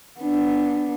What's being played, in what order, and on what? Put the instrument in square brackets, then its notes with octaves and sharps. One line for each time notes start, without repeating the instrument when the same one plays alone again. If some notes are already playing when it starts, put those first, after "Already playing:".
[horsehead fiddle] B3 D4